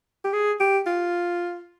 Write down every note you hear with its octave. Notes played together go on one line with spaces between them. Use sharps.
G4
G#4
G4
F4